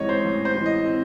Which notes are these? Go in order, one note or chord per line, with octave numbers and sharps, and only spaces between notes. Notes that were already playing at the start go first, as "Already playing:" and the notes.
Already playing: A1 G#2 E3 C4 C#5 D#5
C5
A1
C5
E3
D#5
C4